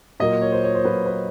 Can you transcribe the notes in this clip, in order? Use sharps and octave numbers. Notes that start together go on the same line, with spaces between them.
A#2 F#3 A#3 D#5
C#5
C5
C#5
C5
A#2 F#3 A#3 B4
B4